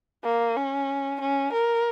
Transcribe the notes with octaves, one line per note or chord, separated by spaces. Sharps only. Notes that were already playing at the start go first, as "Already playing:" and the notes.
A#3
C#4
C#4
A#4